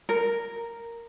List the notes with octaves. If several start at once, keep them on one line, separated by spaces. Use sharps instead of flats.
A#4